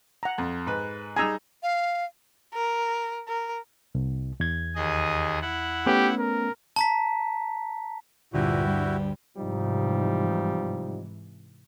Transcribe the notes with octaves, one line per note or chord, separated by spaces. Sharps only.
F#5 A#5
F2
G#2 B4
G3 D#4 G#4 G#5 A#5 E6
F5
A#4
A#4
C2
E2 G#6
D#2 G#4 D#5
E4 F#5
A3 B3 C#4 G4
A#4
A5 A#5 B6
D2 G2 A#2 E4 F#4 G4 G#5 E6
G3
G#2 C3 E3 F3 G3 D#4